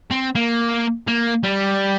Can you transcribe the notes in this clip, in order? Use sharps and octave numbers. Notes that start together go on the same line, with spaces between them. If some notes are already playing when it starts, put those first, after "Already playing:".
C4
A#3
A#3
G3